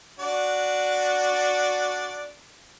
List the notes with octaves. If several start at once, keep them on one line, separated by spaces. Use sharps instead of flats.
D4 F#4 D5